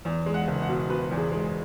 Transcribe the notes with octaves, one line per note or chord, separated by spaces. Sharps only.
E2
G#3
F#5
F#1
F#5
B2
B2 B4
E2
G#4
G#3